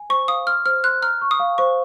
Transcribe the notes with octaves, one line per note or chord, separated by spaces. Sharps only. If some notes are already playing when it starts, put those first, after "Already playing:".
Already playing: G#5
C5 C#6
F5 D#6
C6 F6
C5 F6
C6 F#6
A#5 F6
C#6
D#6
F5
C5 C#6